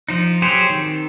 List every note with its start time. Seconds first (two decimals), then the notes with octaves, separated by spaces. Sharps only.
0.09 F3 D#4
0.42 F#3 G4 G#4 C5 C#5
0.70 D#3 C4